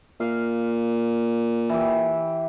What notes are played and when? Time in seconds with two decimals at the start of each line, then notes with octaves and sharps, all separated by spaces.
0.20 A#2 F5
1.70 E3 G4